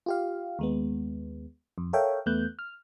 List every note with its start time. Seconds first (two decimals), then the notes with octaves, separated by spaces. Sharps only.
0.06 F4 G4 F5
0.59 D#2 G#3 B3
1.78 F2
1.93 A4 A#4 C#5 E5 F5 G5
2.26 E2 A3 B3 F#6 G6
2.59 F6